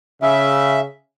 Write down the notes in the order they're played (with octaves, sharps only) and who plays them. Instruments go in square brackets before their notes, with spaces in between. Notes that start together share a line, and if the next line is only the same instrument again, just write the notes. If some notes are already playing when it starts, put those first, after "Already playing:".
[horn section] C#3 [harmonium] E5